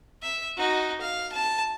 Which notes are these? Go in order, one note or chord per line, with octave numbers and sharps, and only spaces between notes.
E5
D#4 F#4
F5
A5